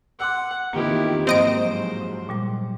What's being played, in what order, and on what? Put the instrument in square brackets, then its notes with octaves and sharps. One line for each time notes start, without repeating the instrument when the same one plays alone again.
[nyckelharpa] F#5 [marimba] C6 D6 E6
[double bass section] E2 D#3 C4 [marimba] A#3 F4 [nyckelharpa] E4 G4
[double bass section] G#2 F3 F#3 [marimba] A#3 [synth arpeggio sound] C4 D#5 D7 [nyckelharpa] C5
[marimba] A#2 G3 D6